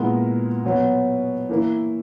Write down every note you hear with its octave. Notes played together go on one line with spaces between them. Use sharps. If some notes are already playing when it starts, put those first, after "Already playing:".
Already playing: A#2 G#3 B3 E4 A#4
B2 F#3 B3
E3 A#3 E4